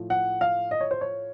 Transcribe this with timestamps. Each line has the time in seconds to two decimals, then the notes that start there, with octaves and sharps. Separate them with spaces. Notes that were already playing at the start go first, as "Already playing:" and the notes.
Already playing: A2 F3
0.10 F#5
0.41 F5
0.71 D#5
0.81 C#5
0.91 C5
1.01 C#5